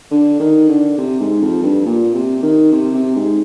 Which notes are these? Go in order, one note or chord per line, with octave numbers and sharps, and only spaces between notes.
D3
D#3
D3
C3
G#2
F2
G2
A#2
C3
D#3
C3
C3
G#2